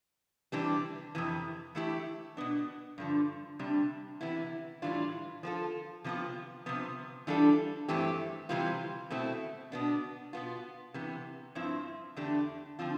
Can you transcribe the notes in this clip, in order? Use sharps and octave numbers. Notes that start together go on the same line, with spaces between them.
C3 E3 G3 D4 G4
F2 C3 E3
E3 A3 E4 G4
B2 B3 D4
G2 D3 F3
C3 G3 D4
C3 E3 B3 E4
A2 E3 G3 D4 F4
F3 B3 F4 A4
C3 F3 B3 F4
C3 F3 B3
E3 G3 D4 F4 A4
G2 E3 A3 C4 G4
C3 E3 G3 C4 F4
B2 A3 C4 E4
B2 B3 D4
B2 B3 F4
C3 E3 B3
G2 F3 C4 E4
E2 D3 A3 D4 G4
D3 F3 C4 F4